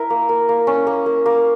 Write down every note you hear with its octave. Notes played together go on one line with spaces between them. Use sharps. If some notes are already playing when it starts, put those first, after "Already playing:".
Already playing: E4 A#4
A#3
A#3
A#3
C#4
A#3
A#3
A#3